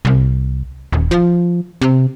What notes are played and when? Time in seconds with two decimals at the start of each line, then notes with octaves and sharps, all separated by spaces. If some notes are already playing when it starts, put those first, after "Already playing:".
0.05 C2
0.92 D#1
1.11 F3
1.81 C3